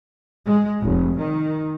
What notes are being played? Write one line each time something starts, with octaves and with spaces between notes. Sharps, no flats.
G#3
F1
D#3